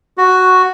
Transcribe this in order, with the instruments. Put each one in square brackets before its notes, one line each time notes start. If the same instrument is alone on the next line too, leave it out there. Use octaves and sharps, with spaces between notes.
[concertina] F#4